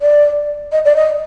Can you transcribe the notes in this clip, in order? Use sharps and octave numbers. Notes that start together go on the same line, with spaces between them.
D5
D#5
D5
D#5